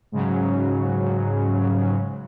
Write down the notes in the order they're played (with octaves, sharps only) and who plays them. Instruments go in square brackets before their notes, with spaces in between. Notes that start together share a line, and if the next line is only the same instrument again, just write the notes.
[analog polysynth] G#2 C#3 F#3